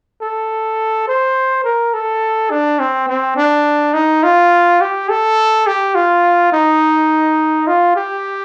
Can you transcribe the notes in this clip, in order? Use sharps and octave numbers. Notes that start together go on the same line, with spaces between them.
A4
C5
A#4
A4
D4
C4
C4
D4
D#4
F4
G4
A4
G4
F4
D#4
F4
G4